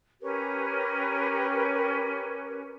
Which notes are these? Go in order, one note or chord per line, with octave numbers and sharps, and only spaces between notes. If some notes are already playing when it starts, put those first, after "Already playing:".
C#4 G4 A#4 B4